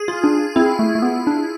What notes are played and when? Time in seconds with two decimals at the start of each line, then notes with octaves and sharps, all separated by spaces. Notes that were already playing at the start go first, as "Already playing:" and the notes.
Already playing: G#4
0.08 F4
0.24 D4
0.56 C4 E4
0.79 A3
0.95 A3
1.02 B3
1.27 D4